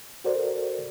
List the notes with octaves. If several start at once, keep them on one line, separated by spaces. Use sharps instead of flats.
F#4 A4 A#4 C5 D5